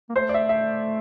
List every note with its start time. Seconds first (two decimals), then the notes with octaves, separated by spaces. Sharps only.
0.09 A#3
0.15 A3 C5
0.29 D5
0.34 E5
0.49 E5